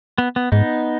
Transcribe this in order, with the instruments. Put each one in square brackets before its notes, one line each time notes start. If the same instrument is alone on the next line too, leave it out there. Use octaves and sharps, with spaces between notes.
[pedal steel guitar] B3
B3
[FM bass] G#2 [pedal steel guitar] B3 D#4